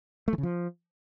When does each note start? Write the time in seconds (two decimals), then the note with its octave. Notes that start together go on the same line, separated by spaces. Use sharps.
0.28 A3
0.33 E3
0.38 C#3
0.43 F3